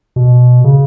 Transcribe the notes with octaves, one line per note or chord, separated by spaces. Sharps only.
B2
C#3